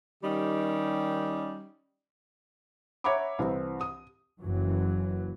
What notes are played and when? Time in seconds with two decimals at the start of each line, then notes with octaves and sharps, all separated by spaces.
0.23 D#3 G3 C#4 D#4 G4
3.04 C#5 E5 F#5 A#5 B5 D6
3.39 C2 E3 C4
3.81 D#6
4.41 F#1 F#2 E3 F#3